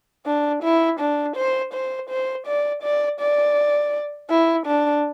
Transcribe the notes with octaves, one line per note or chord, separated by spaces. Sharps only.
D4
E4
D4
C5
C5
C5
D5
D5
D5
E4
D4